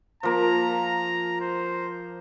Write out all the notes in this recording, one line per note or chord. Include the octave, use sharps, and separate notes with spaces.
F3 A#3 A#5
C5